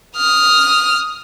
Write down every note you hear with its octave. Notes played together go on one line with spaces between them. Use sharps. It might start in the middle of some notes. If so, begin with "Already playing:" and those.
D#6 F6